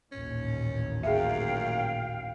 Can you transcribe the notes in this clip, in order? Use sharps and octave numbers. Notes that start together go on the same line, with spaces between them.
A1 D#2 A#2 C#4
F#2 G#4 E5 F5 G5